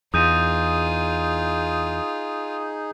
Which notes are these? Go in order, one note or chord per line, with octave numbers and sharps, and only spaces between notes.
E2 D#4 F4 G#4 D#6 G6 D#7